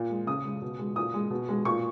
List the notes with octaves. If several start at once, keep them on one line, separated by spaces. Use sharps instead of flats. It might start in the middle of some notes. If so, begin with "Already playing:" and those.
Already playing: A#2
G#3
C#3 D#6
G#3
B2
G#3
A#2 D#6
G#3
B2
G#3
A#2 C#6